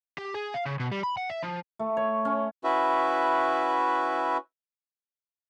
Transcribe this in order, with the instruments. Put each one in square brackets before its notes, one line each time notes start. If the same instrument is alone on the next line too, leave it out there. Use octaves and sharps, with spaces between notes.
[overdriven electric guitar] G4
G#4
F5
C#3
B2
G3
B5
F#5
E5
F3
[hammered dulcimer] A3
C#5
C#4
[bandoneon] C#4 E4 F#4 B4 E5